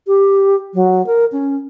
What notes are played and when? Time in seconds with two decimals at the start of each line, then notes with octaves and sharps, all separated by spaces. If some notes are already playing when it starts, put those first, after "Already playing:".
0.07 G4
0.74 F#3
1.07 A#4
1.32 C#4